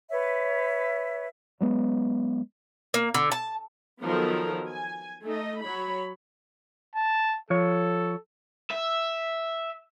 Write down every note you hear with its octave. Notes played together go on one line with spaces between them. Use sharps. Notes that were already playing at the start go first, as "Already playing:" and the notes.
B4 C#5 E5
F#3 G#3 B3
A#3
D3
A5
D#3 F3 F#3 B3 A4 A#4
G#5
A3 D#4 D#5
F#3 C#5 B5
A5
F3 A4 C#5
E5